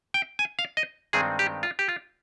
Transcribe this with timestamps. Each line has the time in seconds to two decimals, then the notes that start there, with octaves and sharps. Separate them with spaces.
0.14 G5
0.39 G#5
0.59 F5
0.77 D#5
1.13 G2 D#3 G#3 C4 D#4 G#4
1.39 G4
1.63 F4
1.79 G4
1.89 F4